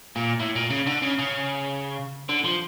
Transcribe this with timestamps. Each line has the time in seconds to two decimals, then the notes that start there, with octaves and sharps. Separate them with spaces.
0.16 A#2
0.40 A2
0.55 A#2
0.70 C#3
0.87 D3
1.02 C#3
1.19 C#3
2.29 D3
2.45 F3